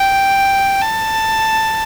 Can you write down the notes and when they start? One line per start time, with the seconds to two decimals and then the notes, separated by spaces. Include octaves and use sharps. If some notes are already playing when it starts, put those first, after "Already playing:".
Already playing: G5
0.82 A5